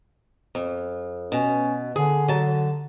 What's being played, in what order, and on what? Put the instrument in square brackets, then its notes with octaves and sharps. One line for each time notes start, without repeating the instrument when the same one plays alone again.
[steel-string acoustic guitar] F2
[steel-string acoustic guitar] B2 [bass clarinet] C#4
[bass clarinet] D3 [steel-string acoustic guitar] G#4
[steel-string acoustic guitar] F#3 A5